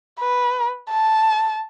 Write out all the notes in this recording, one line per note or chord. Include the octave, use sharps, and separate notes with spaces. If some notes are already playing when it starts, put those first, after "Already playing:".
B4
A5